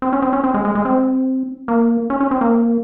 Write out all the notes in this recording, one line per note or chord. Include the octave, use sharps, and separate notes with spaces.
C4
C#4
C4
C#4
C4
G#3
G#3
G#3
C4
A#3
C#4
C#4
C4
A#3